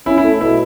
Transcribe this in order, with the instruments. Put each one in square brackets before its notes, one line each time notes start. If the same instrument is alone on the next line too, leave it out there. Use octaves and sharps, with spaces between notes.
[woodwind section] C#4 [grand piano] E4
[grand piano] E4
[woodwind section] A3
[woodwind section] B2 [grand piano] E4